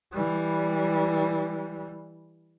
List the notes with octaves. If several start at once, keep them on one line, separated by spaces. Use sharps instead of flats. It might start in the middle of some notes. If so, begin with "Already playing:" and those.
E3 G3